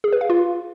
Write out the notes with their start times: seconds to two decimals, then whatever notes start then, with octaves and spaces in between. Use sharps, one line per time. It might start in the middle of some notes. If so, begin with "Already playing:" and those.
0.04 G#4
0.12 B4
0.21 F5
0.30 F4